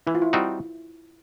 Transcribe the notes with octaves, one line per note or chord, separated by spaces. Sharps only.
E3 E4
F4
E4
G3 C4 D#4 F#4